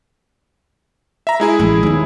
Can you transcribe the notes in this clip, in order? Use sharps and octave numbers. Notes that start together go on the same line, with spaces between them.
E5 A#5
G#3 E4 G#4
A1
D#2 B3